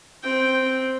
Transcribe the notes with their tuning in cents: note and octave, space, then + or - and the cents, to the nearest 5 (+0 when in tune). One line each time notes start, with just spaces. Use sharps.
C4 +0 G5 -5